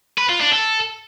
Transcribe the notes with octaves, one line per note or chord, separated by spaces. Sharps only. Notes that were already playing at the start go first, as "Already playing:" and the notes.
B4
F4
D4
A4